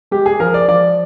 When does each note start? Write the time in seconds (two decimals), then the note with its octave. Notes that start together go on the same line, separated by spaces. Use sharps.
0.11 G#3 G4
0.26 G#4
0.40 F3 A#4
0.54 D5
0.68 F3 D5